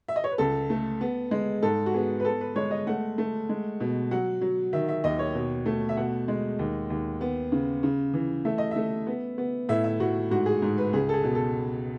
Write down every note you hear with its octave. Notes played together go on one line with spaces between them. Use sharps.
E5
D#5
C#5
B4
C#2 A4
A3
B3
G#3
G#2 A4
F#4
B3 G#4
B4
B3 A4
B4
G#3 C#5
D#5
A3 F#5
A3
G#3
B2
F#3 F#5
F#3
D#3 E5
E5
D#2 D#5
C#5
B2
A3
E5
B2 F#5
G#3
D#2
D#2
B3
C#3
C#3
E3
A3 E5
D#5
A3 E5
B3
B3
A2 E5
E5
A2 F#4
G#2 F#4
G#4
G#2
B4
C#2 G#4
A4
G#4
B2
A4